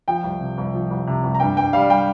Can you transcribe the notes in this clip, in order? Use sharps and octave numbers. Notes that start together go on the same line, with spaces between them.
F3 G5
C2
C3
C2
F3
C2
C3
C2
A#5
G2 G5
G2 G5
G3 F5
G3 G5